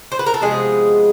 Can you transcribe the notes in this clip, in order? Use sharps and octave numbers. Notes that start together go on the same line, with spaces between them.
C5
B4
A#4
A4
C3 F3 G#3 B3 G#4